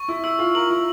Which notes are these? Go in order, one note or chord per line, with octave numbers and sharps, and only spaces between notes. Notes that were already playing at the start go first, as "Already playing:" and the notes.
Already playing: C#6
E4
E4 E6
F4
A#4 F#7
E4